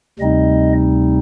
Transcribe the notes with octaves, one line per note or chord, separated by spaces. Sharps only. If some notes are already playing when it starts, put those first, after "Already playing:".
D2 C3 G3 C4 D#4 D#5